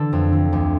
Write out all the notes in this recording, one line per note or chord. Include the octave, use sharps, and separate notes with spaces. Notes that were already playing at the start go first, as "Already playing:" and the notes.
Already playing: D3 A4
F2
D3
D2